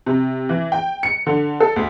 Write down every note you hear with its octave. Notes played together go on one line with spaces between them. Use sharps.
C3
E3
G5
C#7
D3
A4
D2